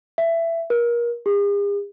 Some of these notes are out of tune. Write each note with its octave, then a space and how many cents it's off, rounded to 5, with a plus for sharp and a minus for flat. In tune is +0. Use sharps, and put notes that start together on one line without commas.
E5 +15
A#4 +30
G#4 -45